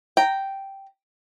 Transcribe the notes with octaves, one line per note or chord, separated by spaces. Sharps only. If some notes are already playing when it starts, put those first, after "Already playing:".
G5 A#5